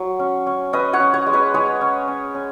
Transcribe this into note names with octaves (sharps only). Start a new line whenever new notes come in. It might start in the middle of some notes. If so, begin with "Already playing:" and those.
Already playing: F#3
C#4
C#4
C#4 B4 D#5
C#5 F#5
C#4
C#5 F#5
G#3
B4 D#5
G#3 G#4 C#5
C#4
C#4
C#4